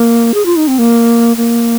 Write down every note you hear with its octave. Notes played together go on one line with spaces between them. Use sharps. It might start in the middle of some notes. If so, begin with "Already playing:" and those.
Already playing: A#3
G#4
F4
D#4
C4
A#3
A#3